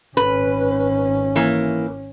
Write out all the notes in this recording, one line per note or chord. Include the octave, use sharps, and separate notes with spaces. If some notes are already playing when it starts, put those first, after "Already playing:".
G#1 C#4 B4
E3 A#3